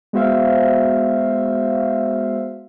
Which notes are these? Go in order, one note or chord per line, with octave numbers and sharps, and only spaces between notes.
G#3 B3 F#4 C5 E5 F5